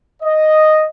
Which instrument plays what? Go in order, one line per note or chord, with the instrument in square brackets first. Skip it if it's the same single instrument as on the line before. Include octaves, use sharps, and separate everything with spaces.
[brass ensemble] D#5